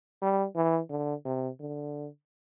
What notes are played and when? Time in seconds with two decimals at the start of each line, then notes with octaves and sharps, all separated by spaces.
0.22 G3
0.56 E3
0.90 D3
1.25 C3
1.60 D3